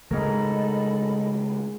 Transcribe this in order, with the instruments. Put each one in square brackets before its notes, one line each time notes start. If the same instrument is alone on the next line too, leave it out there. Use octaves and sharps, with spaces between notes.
[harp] G#2 A#4 [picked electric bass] C#3 G#3 A3 [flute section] A4 D#5 B5